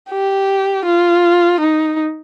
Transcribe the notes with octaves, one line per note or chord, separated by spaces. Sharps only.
G4
F4
D#4